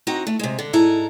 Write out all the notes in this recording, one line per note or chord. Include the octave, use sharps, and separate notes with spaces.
C4 D#4 F#4 F#5 A#5
A3
C3 G#3
D3
G#2 E4 A4 A#5